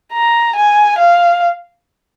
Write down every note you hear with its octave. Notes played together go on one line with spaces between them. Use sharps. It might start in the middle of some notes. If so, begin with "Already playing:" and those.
A#5
G#5
F5